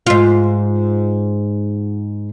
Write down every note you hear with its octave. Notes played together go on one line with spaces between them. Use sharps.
G#2 F4